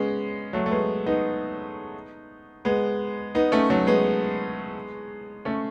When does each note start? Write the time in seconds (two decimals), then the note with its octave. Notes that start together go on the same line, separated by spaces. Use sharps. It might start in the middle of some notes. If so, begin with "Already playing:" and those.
Already playing: G#3 B3 C#4
0.53 F#3 A3
0.66 A3
0.71 G#3 B3
1.06 B3 D#4
2.65 G#3 B3
3.35 B3 D#4
3.52 A3 C#4
3.70 F#3 A3
3.87 G#3 B3
5.45 A3 C#4